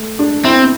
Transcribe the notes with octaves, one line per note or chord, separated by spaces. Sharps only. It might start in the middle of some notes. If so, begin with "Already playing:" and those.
Already playing: A3
D4
C4 E4